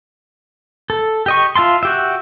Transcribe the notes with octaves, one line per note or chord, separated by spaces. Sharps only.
A4
G4 D#5 C#6
F4 E5 A5 C6
F#4 G4 E5